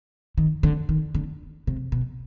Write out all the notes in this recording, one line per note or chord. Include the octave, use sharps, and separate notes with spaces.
D#3
D3
D#3
D3
C3
B2